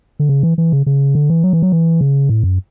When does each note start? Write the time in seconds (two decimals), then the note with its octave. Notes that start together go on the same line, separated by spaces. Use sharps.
0.20 D3
0.29 C#3
0.43 E3
0.58 E3
0.72 C#3
0.86 C#3
1.15 D3
1.30 E3
1.43 F#3
1.53 E3
1.62 F#3
1.72 E3
2.01 C#3
2.29 A2
2.43 F#2